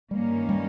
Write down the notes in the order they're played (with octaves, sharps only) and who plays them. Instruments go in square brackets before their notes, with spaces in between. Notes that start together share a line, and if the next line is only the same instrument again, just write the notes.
[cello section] G2 D#3 A#3 C#4 [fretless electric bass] G3
[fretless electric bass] G3